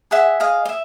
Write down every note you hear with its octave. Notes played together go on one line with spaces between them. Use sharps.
G#4 E5 F#5
G#4 D#5 F5
D#5
E5